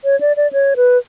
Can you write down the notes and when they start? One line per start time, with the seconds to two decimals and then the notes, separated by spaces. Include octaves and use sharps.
0.04 C#5
0.21 D5
0.37 D5
0.53 C#5
0.76 B4